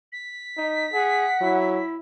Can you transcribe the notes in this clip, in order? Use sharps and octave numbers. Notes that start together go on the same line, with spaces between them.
B6
D#4
G#4 F#5
F#3 E4